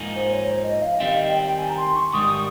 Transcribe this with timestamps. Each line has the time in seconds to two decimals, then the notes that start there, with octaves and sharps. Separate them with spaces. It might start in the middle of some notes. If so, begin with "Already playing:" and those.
Already playing: G#2 F3 A#3 D#4 G#4
0.16 C5
0.32 C#5
0.44 C5
0.63 D#5
0.82 F5
0.95 D#5
1.00 D#3 G3 C4 F5
1.15 D#5
1.29 G5
1.44 G5
1.57 G#5
1.69 A#5
1.77 C6
1.96 C#6
2.14 G#2 D#3 G3 D#6